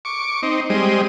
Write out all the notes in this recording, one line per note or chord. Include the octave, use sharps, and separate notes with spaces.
C#6 D6
C4 D#4
G3 G#3 C4 D#5